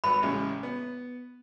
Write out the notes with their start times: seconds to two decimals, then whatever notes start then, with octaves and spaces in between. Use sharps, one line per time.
0.04 G#1 B4 B5
0.23 A1 C#3 G#3
0.63 B3